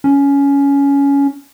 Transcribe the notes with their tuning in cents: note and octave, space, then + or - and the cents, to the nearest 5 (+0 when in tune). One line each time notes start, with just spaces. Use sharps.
C#4 +15